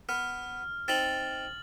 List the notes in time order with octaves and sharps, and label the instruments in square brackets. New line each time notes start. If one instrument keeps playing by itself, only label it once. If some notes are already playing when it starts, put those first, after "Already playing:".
[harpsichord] B3 [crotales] F6
[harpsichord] C4 D#4 [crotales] A6 F#7